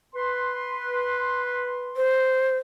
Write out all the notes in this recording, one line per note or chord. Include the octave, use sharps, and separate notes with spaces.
B4 C6
C5